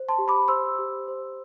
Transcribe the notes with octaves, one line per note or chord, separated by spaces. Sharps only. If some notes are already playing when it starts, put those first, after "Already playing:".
Already playing: C5
A5 C6
G4
B5 D6
C5 C6 E6
G4
C5